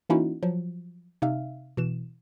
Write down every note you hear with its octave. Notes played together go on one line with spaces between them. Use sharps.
E3 A#3 C#4 D#4 E4 F#4
F3 F#3
C3 D#4 E5 F5
B2 E3 E7